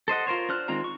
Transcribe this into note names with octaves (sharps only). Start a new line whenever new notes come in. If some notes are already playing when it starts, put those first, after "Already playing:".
A4 C5 D#5 F#5
F4 A#4 C5 C#5
D4 C5 F6 F#6
D#3 G#3 C4 F4 A#5
C#6